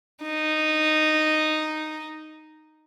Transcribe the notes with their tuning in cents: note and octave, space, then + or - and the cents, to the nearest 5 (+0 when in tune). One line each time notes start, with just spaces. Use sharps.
D#4 -10